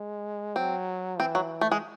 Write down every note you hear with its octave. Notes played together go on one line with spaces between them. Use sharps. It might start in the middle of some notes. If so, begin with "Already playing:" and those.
Already playing: G#3
F#3 C4
E3 C4
F#3
A3
G#3